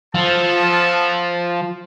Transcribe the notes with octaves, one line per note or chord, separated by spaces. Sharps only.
F3 B3 A4 A5